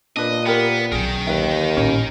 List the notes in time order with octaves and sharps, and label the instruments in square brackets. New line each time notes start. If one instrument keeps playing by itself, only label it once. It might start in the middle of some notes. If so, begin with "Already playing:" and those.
[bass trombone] A#2 [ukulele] D4 B4 [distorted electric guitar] D#5
[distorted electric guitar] B3 [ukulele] G4 A#4 C5
[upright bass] B1 C#4 [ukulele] G#4 [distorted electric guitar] A#4 G5
[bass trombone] D#2 [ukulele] B4 E5
[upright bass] A1 A#2 [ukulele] C#4 E4 C#5